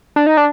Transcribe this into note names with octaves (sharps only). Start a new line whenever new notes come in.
D4
D#4
D4